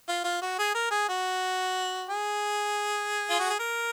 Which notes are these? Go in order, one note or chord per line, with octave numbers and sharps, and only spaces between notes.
F4
F4
F#4
G#4
A#4
G#4
F#4
G#4
F4
F#4
G#4
A#4